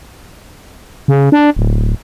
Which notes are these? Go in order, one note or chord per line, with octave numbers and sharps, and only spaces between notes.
C#3
D4
D1